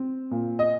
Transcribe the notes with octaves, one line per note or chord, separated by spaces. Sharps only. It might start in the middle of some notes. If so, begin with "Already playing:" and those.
Already playing: C4
A#2
D#5